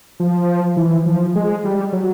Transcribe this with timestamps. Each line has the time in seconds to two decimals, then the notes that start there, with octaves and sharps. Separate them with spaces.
0.20 F3
0.77 E3
1.06 F3
1.35 G#3
1.65 G3
1.93 F#3